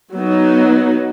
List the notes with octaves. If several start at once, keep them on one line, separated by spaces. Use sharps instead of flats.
F#3 B3 D#4